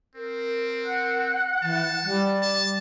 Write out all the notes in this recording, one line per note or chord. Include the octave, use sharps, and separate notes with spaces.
C4 A#4
F#5 F#6
E3 A5
G3
A5